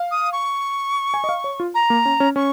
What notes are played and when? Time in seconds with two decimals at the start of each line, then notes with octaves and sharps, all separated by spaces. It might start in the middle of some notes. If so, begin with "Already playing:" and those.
Already playing: F5
0.11 D#6
0.33 C#6
1.14 G#5
1.24 D#5
1.29 F5
1.44 C#5
1.60 F4
1.75 A#5
1.90 A#3
2.05 C#4
2.20 C#4
2.36 C#4 C#6